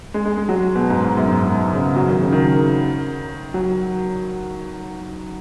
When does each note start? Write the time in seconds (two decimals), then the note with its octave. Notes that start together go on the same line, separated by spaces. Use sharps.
0.14 G#3
0.25 G#3
0.37 G#3
0.49 F#3
0.75 B2
0.90 G#2
1.04 G#2
1.17 F#2
1.28 G#2
1.50 B2
1.73 C#3
1.96 F#3
2.08 D#3
2.21 C#3
2.32 D#3
3.54 F#3